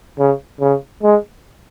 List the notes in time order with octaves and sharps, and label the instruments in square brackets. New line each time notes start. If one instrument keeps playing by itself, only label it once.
[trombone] C#3
C#3
G#3